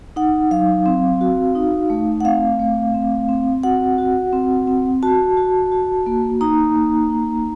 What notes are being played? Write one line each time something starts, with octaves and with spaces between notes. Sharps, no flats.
D#4 F#5
F#3 F5
C4
F#4
D#4
A3
F#5
C4 F5
A3
C4
C4
F#4 F#5
F#4
C4
C4
F#4 A5
F#4
F#4
A#3
D#4 A#5
A#3
D#4